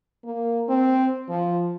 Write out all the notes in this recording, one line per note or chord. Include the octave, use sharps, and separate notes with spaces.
A#3
C4
F3